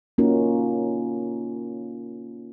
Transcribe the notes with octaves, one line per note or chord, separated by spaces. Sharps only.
A#3 C#4 D#4 F4 F#4 A#4